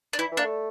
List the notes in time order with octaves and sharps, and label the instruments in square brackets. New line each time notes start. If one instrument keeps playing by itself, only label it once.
[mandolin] D4
[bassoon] E3 [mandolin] E4
[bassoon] E3
[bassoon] A#3 [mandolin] D4
[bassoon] A3